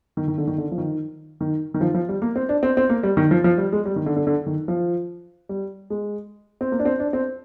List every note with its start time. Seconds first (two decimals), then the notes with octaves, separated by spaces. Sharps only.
0.17 D#3
0.28 D#3
0.38 D3
0.47 D#3
0.58 D3
0.72 F3
0.78 D#3
1.41 D#3
1.74 D#3
1.81 F3
1.94 F3
2.09 G3
2.22 A#3
2.36 C4
2.49 D4
2.63 C4
2.77 C4
2.89 A#3
3.03 G3
3.17 D#3
3.31 F3
3.44 F3
3.58 G3
3.72 G#3
3.85 G3
3.96 D#3
4.06 D3
4.16 D3
4.27 D3
4.46 D#3
4.68 F3
5.49 G3
5.90 G#3
6.61 C4
6.72 A#3
6.79 D4
6.85 C4
7.00 D4
7.13 C4